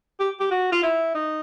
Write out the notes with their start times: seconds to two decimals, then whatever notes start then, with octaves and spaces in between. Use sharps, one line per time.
0.20 G4
0.40 G4
0.51 F#4
0.72 F4
0.83 E4
1.14 D#4